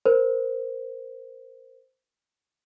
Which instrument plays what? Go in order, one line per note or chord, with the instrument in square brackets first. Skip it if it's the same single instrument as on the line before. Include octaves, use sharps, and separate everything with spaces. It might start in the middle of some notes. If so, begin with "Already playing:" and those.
[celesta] A#4 C5